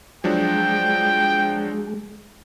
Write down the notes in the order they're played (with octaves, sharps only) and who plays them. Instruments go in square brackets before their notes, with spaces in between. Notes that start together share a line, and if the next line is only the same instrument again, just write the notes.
[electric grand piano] F3 F#3 D4 [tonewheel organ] G#3 [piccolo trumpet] G5